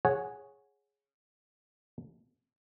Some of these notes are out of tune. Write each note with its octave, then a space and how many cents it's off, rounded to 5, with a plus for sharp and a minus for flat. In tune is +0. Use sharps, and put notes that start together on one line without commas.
G#4 +0 C#5 -5 F#5 +0